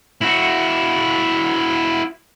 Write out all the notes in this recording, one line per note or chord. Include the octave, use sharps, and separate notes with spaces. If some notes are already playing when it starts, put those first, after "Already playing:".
E4 F#4